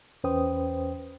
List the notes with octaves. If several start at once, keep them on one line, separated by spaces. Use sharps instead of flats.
E2 C#4 B4 C5 G5 D#6